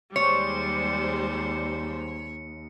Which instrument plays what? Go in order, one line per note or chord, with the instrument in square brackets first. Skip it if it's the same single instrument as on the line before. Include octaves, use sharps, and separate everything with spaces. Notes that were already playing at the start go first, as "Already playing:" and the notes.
[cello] D#2 [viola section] G3 G#3 C5 [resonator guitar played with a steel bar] C#5 [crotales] C#7